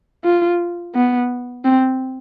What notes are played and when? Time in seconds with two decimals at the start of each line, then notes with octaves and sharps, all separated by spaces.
0.25 F4
0.95 B3
1.65 C4